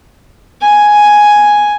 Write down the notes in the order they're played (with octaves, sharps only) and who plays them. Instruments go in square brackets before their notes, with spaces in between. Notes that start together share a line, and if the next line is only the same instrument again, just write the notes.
[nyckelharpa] G#5